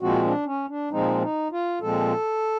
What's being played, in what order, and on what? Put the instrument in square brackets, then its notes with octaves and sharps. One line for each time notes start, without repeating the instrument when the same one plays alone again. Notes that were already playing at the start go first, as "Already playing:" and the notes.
[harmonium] A#2 F3 G#3 C4 F#4
D4
C#4
D4
A#2 F3 G#3 C4 D#4
D#4
F4
A#2 F3 G#3 C4 A4